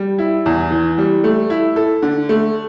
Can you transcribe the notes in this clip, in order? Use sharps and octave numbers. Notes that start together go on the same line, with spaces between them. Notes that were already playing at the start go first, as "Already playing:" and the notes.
Already playing: G3
E4
E2
E3
G3
A3
E4
A4
D3
A3